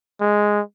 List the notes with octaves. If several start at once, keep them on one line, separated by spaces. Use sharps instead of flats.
G#3